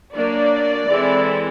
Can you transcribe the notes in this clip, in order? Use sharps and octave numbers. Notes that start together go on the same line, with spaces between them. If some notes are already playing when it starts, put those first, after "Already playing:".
F#3 A#3 D4 D5
E3 G#3 C4 E4 A4